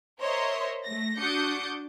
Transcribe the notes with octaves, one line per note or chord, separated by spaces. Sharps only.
A#4 C5 C#5 D#5 E5 C6
A3 A#6
D4 F#4 D6 D#6 G6 C#7